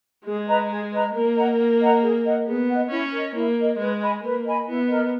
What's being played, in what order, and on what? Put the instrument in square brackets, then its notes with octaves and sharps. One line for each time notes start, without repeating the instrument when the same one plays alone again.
[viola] G#3 [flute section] G#4
[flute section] B4 D#5 A#5
G#4
B4 D#5 A#5
[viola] A#3 [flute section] A#4
[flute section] D#5 F#5 A#5
A#4
D#5 F#5 A#5
G#4
D#5 F#5
[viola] B3 [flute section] G#4
[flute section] D#5 F#5
[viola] C#4 [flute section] E4
[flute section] A#4 D#5
[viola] A#3 [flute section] E4
[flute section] A#4 D#5
[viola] G#3 [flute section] B4
[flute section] D#5 G#5 B5
[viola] A#3 [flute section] B4
[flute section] D#5 G#5 B5
[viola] B3 [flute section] E4
[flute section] A#4 D#5